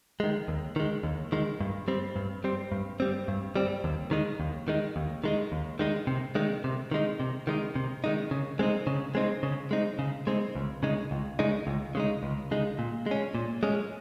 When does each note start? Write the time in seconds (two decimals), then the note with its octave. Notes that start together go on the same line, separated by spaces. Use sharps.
0.20 D#3 G#3
0.48 D#2
0.76 D#3 G#3
1.03 D#2
1.32 D#3 G#3
1.60 G2
1.88 G3 C4
2.16 G2
2.44 G3 C4
2.72 G2
3.00 G3 C4
3.28 G2
3.56 G3 C4
3.84 D#2
4.11 D#3 G#3 D#4
4.40 D#2
4.68 D#3 G#3 D#4
4.96 D#2
5.24 D#3 G#3 D#4
5.52 D#2
5.79 D#3 G#3 D#4
6.07 C3
6.35 D#3 G#3 D#4
6.64 C3
6.92 D#3 G#3 D#4
7.20 C3
7.47 D#3 G#3 D#4
7.76 C3
8.04 D#3 G#3 D#4
8.31 C#3
8.59 G#3 C4 D#4
8.87 C#3
9.15 G#3 C4 D#4
9.43 C#3
9.71 G#3 C4 D#4
9.99 C#3
10.27 G#3 C4 D#4
10.55 C#2
10.83 C#3 G#3 D#4
11.11 C#2
11.39 C#3 G#3 D#4
11.67 C#2
11.95 C#3 G#3 D#4
12.23 C#2
12.51 C#3 G#3 D#4
12.79 A#2
13.06 G#3 C#4
13.35 A#2
13.63 G#3 C#4